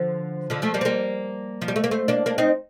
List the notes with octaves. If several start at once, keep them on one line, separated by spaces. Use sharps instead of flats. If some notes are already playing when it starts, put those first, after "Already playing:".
Already playing: D3 F3
D3 F3
F3 A3
G3 A#3
C4
G3 A#3
F3
G3
A3
A#3
A3 C4
A#3 D4
A#3 D4
C4 D#4